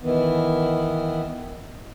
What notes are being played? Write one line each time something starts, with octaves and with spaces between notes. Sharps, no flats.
D#3 E3 B3